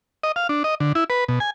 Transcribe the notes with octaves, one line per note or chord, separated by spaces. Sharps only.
D#5
F5
D4
D#5
D3
E4
B4
B2
G#5